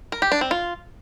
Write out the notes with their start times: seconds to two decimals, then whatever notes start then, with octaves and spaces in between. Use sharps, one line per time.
0.12 A#4
0.22 G4
0.32 D4
0.41 C4
0.51 F4